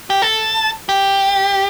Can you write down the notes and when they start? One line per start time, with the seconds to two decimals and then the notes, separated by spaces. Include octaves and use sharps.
0.10 G4
0.22 A4
0.89 G4